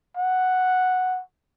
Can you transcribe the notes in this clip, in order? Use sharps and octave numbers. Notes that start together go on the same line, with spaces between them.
F#5